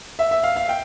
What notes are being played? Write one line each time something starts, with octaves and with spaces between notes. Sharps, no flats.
E5
E5
F5
F5
G5